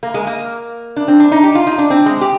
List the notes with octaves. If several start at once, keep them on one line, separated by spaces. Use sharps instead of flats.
A#3
G#3
A#3
D4
C4
D4
D#4
G4
F4
D#4
D4
C4
G#3
G4